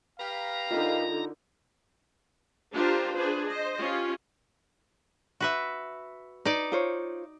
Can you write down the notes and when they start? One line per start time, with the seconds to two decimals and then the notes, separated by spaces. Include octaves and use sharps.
0.19 G4 B4 F5 A#5
0.71 D3 D#4 F4 A#4 D#5
2.73 D4 F4 G4 A#4 C5
3.15 D4 G#4 B4 C5
3.47 C5 D#5
3.79 C#4 F4 G4
5.40 F#4 B4 E5
6.45 D#4 B4 D5
6.72 F4 C5 C#5